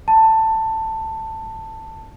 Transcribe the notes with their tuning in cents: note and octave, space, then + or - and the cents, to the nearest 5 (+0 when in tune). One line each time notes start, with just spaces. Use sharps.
A5 +15